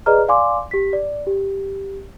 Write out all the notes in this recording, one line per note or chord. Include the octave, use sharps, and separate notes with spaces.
G#4 B4 D5 D#5 A#5 F6
D5 F5 G#5 C6 D6
G4 B6
D5
G4